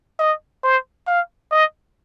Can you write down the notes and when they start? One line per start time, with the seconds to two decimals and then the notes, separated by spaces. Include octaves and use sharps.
0.19 D#5
0.63 C5
1.07 F5
1.51 D#5